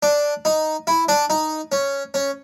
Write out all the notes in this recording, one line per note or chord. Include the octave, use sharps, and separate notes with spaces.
D4
D#4
E4
D4
D#4
C#4
C#4